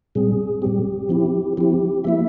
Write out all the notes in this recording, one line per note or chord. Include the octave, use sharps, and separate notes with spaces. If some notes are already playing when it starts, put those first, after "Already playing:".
A#2 G3 C4 G#4
A#2 G3 C4 G4
F3 C4 E4
F3 C4 E4 G4
F3 A#3 E4 E5